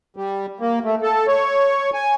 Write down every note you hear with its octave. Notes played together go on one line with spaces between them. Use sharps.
G3
A#3
A3
A4
C#5
G#5